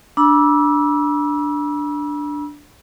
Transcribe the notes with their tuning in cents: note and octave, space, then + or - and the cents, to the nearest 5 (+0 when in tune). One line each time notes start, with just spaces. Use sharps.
D4 +0 B5 -40 E6 -5